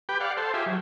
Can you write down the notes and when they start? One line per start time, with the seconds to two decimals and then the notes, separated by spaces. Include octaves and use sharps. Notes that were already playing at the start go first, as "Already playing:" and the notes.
0.09 G4 B4 G5
0.20 D5 F5 F#5
0.37 A4 C5
0.54 F4 G4 G#4 E5
0.66 F#3